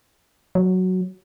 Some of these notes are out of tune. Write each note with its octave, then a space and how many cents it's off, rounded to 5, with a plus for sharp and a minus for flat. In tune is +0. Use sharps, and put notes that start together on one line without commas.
F#3 +0